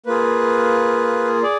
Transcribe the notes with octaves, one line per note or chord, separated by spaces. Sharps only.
A#3 F4 G#4 B4
G#4 D5